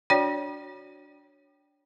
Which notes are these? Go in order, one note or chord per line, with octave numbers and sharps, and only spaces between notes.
D4 F#4 C#5 D5 G5